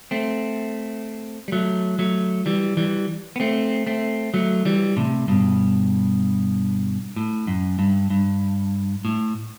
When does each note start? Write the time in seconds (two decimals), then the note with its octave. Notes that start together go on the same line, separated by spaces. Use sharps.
0.11 A3 C4
1.48 G3
1.52 F#3 A3
1.99 F#3 A3
2.46 E3 G3
2.77 E3 G3
3.36 B3
3.40 A3 C4
3.87 A3 C4
4.34 F#3 A3
4.65 E3 G3
4.97 A2 C3
5.28 G2 B2
7.16 A2
7.47 F#2
7.79 G2
8.10 G2
9.05 A2